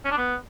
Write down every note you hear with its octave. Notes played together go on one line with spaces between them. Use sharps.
C#4
D4
B3